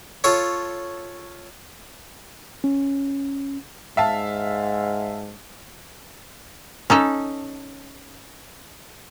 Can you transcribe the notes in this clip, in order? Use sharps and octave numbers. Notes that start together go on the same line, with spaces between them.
F4 A4 C#5
C#4
G#2 E5 F5 A5
C#4 D#4 A4